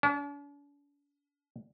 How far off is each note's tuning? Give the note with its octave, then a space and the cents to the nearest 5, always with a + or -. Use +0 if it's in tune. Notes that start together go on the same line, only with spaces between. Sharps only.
D4 -45